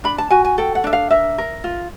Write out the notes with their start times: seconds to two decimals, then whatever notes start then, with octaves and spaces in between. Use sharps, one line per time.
0.04 D4 B5
0.18 A5
0.30 F#4 G#5
0.45 G#5
0.58 A4 G5
0.75 F#5
0.84 D4 E5
0.93 F5
1.10 A#4 E5
1.38 A#4
1.64 F4